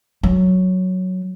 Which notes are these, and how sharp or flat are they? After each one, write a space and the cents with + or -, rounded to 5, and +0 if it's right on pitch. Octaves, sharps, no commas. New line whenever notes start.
F#3 +0